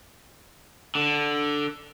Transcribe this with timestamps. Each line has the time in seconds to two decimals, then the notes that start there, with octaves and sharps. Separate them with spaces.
0.95 D3